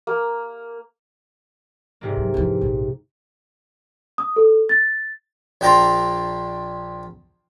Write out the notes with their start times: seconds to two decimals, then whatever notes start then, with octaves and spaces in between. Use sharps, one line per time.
0.07 A#3
2.01 G#2 C3 A#3
2.17 F#3
2.34 F2 E3
2.61 A#1
4.18 D#6
4.36 A4
4.69 A6
5.61 A#1 D4 G5 A5 A#5 C6